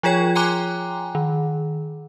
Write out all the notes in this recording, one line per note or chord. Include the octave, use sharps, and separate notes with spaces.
F3 F4 G#4 C#5 G5 G#6
G5 G#5 A#5 C6 D6 F#6
D#3